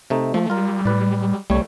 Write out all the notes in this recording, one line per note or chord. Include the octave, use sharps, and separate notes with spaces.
C3 A3 D#4
F3 A3
G3 F4 A#4
A2 B4 D5
C2 G3 A3 C#5